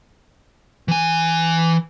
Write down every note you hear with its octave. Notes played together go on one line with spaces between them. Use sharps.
E3 G#5